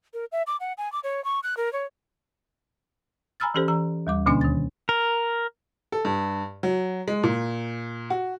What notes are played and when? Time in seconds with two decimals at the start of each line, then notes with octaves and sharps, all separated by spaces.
0.14 A#4
0.32 E5
0.47 D6
0.60 F#5
0.78 G#5
0.92 D6
1.04 C#5
1.24 C#6
1.43 F#6
1.57 A#4
1.73 C#5
3.40 G#5 A#5 B5 E6 F6 A6
3.54 E3 C#4 G4 A4 C5
3.68 E3 A#5
4.07 D#2 G3 D6
4.26 D2 B2 D3 A#3 C#4 D4
4.41 D#3 A6
4.89 A#4
5.92 A4
6.05 G2
6.63 F#3
7.08 G#3
7.24 A#2
8.10 F#4